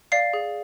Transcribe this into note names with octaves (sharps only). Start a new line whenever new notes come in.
D5 F5 C7
G#4